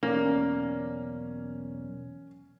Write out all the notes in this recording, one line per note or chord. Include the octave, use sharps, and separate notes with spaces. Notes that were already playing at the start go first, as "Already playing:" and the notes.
B1 E2 A#3 C#4 D5